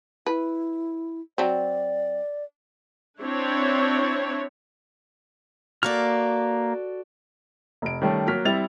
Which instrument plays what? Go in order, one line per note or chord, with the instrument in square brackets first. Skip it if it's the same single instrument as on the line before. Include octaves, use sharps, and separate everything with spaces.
[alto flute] E4 [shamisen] B4
[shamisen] F#3 C4 [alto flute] D5
[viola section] C4 D4 E4 C#5
[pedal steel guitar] A#3 F6 [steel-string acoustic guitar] F#4 A4 D5
[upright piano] F1 D7
D#3 G3 A3 C#4
F#3 A#3 F#4 F6 B6
G3 C4 E4 A6 F7